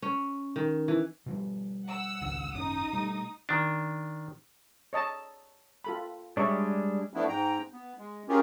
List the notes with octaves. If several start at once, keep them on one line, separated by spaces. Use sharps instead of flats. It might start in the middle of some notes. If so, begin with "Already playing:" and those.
C#4
D#3
E3
B2 F3 G3
F#5 E6
D#1 G#1 C#2
G#1 F#2 C#4 D#4 D#6
B2 G3 A3
D#3 D4
C#5 D#5 A5
F4 A4 B5
G3 G#3 D4 C#5 D5 E5
F3 A3 B3 D4 E4
G#2 G5 A#5
B3
G#3
C#4 F4 G4 G#4 A#4